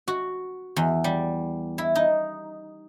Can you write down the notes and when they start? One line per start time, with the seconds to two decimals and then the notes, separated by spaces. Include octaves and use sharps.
0.08 F#4
0.76 E2
1.04 G3
1.78 E4
1.95 D#4